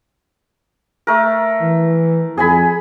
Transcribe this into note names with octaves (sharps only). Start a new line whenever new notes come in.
A3 A#4
E3
F2 G#4 G#5 B5